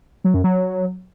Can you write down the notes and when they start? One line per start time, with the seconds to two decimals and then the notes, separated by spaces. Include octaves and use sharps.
0.24 F#3
0.34 F#2
0.44 F#3